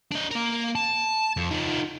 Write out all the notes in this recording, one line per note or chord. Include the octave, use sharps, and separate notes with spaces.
D4 D#5
A#3 A#4
A5
F2
F3 D#4